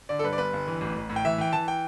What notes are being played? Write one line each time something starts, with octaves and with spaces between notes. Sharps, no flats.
D3 D5
A4
G2 B4
D5
G1 B4
G1
E3
A1
A1
A2
G5
E3 E5
E3 G5
E3 A5
G5